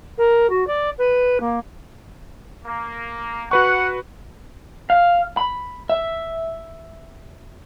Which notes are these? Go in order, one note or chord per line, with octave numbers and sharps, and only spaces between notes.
A#4
F#4
D5
B4
A#3
A#3
F#4 B4 F#5 C#6
F5
B5
E5